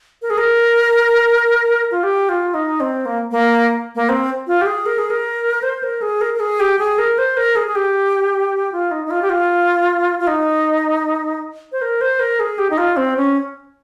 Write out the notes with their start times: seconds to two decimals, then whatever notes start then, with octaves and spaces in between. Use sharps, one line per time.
0.22 A#4
0.30 G#4
0.38 A#4
1.91 F4
2.03 G4
2.29 F4
2.54 D#4
2.80 C4
3.06 A#3
3.31 A#3
3.95 A#3
4.09 C4
4.47 F4
4.61 G4
4.66 G#4
4.86 A#4
4.98 G#4
5.10 A#4
5.63 C5
5.83 A#4
6.02 G#4
6.21 A#4
6.34 A#4
6.40 G#4
6.60 G4
6.79 G#4
6.98 A#4
7.18 C5
7.37 A#4
7.56 G#4
7.67 G#4
7.75 G4
8.72 F4
8.91 D#4
9.06 D#4
9.10 F4
9.22 G4
9.30 F4
10.20 F4
10.27 D#4
11.72 C5
11.82 A#4
12.01 C5
12.20 A#4
12.40 G#4
12.58 G4
12.70 D#4
12.78 F4
12.97 C4
13.17 C#4